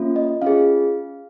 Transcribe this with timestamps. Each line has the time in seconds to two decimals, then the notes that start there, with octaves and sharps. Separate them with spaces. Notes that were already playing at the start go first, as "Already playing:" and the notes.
Already playing: A#3 C#4 F4
0.16 D#5
0.42 C#4 F4 G#4 F5